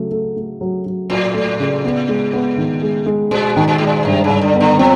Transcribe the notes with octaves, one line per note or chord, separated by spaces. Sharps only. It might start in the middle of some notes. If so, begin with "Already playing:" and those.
Already playing: C#3 F#3 A3
A3
A3
F#3
F#3
A2 F#3
A3
C#3
B3
G#3
B3
D#3
G#3
G#3
A#2 G#3
D#3
A#2
A2 G#3
A#2
G2 C3
C#3
G2
D3
B3
D3
F3 C4